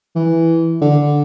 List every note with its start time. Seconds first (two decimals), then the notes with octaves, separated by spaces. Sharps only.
0.16 E3
0.82 D3